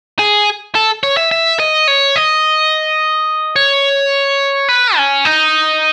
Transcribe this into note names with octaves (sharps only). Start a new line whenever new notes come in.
G#4
A4
C#5
E5
E5
D#5
C#5
D#5
C#5
B4
C#4
D#4